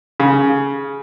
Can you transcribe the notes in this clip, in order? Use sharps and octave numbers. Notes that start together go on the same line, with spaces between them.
C#3